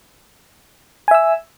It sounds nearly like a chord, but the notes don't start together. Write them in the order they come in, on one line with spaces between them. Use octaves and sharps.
G#5 E5 E6